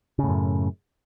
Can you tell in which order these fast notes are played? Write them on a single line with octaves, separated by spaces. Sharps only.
C#3 A2 F#2